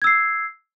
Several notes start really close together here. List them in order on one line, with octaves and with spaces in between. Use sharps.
G#6 E6 C7